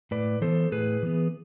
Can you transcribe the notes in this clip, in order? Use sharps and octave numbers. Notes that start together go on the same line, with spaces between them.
A2 B4 D5
E3 B3 A4 C5
A2 G#4 B4
E3 B3